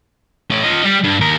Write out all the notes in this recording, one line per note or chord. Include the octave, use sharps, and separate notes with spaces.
A3 C#4
F4 D#5
G3
G2
D#2 A#4